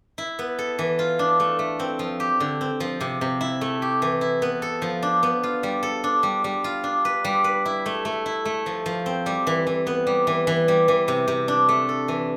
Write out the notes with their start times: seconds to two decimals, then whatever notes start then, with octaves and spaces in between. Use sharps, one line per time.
0.18 E4
0.39 B3
0.59 A4
0.79 E3
0.99 F4
1.19 D4
1.40 A3
1.59 A3
1.80 C4
1.99 F3
2.20 G4
2.40 D3
2.61 C4
2.80 F3
3.01 C3
3.21 C3
3.41 E4
3.61 A3
3.82 G4
4.02 E3
4.21 E4
4.42 B3
4.62 A4
4.82 F3
5.03 D4
5.23 B3
5.43 F4
5.63 G3
5.83 A4
6.04 D4
6.23 G3
6.44 G3
6.64 F4
6.84 D4
7.05 B4
7.25 G3
7.44 B4
7.65 E4
7.86 A3
8.05 A3
8.26 E4
8.45 A3
8.66 F3
8.86 F3
9.06 C4
9.26 G3
9.47 E3
9.67 E3
9.87 B3
10.07 G3
10.27 E3
10.47 E3
10.68 G3
10.88 E3
11.08 C3
11.28 C3
11.48 D4
11.69 A3
11.89 A4
12.08 E3